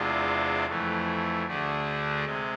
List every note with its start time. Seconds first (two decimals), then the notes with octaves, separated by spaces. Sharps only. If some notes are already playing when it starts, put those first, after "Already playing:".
Already playing: E2 C3 G#3 D4 F4
0.66 F2 E3 A3
1.45 D2 D3 A3 D4 G#4
2.25 C3 G#3